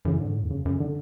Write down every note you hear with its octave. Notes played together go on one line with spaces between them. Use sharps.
F#2 C#3 E3
G#2 D3
A2
E2
F#2 C#3
F#2 C#3
D3